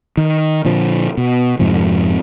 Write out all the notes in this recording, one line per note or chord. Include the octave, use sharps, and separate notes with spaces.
D#3
A#2 D3 F3
B2
F2 G#2 C3 F3